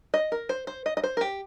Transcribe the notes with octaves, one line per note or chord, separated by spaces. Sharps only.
D#5
A#4
C5
C5
D#5
D#5
C5
A#4
G4